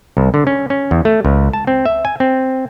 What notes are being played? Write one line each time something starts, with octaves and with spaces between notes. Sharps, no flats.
C2
D3
C#4
C#4
E2
A3
C#2
A5
C4
E5
G#5
C4